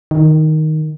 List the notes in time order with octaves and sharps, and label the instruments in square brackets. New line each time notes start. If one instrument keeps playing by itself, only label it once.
[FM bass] D#3